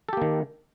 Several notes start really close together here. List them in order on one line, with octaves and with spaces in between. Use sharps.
A4 G4 A#3 D#3